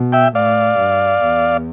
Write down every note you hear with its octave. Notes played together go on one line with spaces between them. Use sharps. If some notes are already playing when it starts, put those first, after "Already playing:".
Already playing: B2
E5 G5
A2 D5 F5
G2
E2